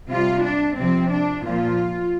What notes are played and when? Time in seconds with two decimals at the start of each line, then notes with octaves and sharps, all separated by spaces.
0.10 C3 G3 F4
0.43 D4
0.77 C3 F3 C4
1.11 D4
1.44 A#2 F3 F4